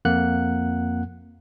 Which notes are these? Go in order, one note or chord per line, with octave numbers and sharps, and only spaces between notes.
F2 A#3 F#5 F#6